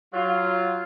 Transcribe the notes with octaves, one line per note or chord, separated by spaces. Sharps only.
F#3 F4